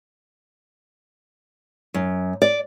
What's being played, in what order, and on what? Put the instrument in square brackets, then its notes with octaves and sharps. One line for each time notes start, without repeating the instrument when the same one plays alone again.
[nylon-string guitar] F#2
D5